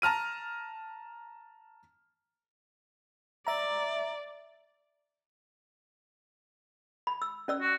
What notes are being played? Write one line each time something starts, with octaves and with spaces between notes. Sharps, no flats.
A5 A#5 F6 D#7
D5 E5 A#5
B5
E6
C#4 D5 E6
F#4